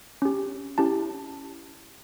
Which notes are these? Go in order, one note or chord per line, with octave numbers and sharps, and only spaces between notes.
C#4 G4
C#4 E4 G4 A5